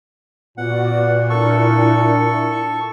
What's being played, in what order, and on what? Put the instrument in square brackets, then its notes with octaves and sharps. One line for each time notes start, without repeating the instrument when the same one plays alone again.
[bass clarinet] A#2 [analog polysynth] B3 F#4 D5 [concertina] F#5
[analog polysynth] D4 E4 A#4 [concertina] A4 C#6